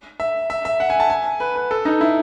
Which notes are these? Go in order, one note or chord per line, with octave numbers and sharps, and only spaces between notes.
E5
E5
E5
F#5
G#5
A5
G#5
B4
B4
A4
D#4
E4